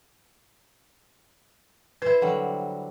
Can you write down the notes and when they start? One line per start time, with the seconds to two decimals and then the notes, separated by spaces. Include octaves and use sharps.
2.02 E4 B4 C5
2.22 D3 F#3 G3